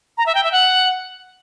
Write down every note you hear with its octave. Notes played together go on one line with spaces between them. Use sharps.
A#5
E5
G5
E5
F#5